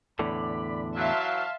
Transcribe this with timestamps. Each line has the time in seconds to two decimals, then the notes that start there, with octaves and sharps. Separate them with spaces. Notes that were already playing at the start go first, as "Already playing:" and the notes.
0.19 E2 A2 D3 D5 B5
0.96 E3 F#3 E5 F5 A5 C6